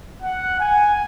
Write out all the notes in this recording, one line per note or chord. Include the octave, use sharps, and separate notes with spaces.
F#5
G#5